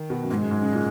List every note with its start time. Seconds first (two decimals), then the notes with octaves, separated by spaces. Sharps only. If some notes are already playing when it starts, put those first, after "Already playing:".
Already playing: D#3
0.10 B2
0.23 F#2
0.30 G#2 A#3
0.34 G#3
0.41 F#2
0.51 G#2
0.62 C#3
0.72 A#2